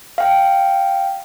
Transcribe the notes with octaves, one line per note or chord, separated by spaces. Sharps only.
F5 G5